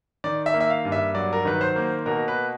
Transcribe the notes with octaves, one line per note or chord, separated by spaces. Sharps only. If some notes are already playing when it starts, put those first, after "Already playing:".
D#3 D5
E5
A#3
E5
F5
G2
E5
F#3 D5
A#4
D#3 B4
C5
A#3
B2 A#4
B4